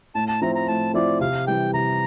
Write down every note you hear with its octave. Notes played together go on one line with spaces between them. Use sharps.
A2 A5
A5
F3 C4 E4 A#5
A#5
A2 A5
F3 C4 E4 D5
C3 F5
E3 G3 G5
C3 A#5